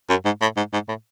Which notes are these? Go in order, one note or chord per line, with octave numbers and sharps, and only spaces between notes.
F#2
G#2
A2
G#2
G#2
A2